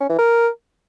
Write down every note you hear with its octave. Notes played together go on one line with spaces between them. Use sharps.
C#4
E3
A#4